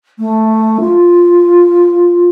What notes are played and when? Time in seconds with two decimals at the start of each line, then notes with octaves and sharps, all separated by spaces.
0.19 A3
0.80 F4